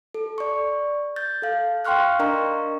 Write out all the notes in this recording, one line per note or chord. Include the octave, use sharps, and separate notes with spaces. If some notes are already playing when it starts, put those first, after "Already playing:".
A4
D5 C#6
G6 A6
A4 F5
F5 G5 C6 C#6 F6 F#6
D4 A#4 D#5 A#5 C#6